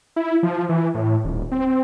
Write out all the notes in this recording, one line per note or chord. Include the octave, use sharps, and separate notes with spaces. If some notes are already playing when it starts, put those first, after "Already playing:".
E4
F3
E3
A2
D#1
C4